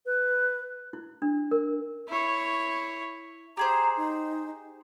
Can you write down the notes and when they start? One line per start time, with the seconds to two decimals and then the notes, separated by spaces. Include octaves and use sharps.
0.06 B4
0.93 E4
1.22 D4
1.51 A#4
2.08 E4 C#5
3.57 G4 G#4 C5 A#5
3.97 D#4